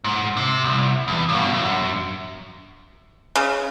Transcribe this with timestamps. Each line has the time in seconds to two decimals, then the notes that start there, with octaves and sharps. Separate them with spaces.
0.04 G#2
0.37 C3
0.64 C2
1.08 E2
1.29 G2 B2
1.53 F#2
3.36 C#3